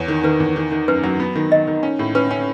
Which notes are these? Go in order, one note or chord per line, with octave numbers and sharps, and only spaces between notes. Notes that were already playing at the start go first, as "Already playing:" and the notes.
Already playing: E2 C#5
D#3
D#3 B4
E2
D#3
D#3
F#2 B4
F#3
B3
D#3
D#3 D#5
D#3
C#4
A2
C#4 B4
C#4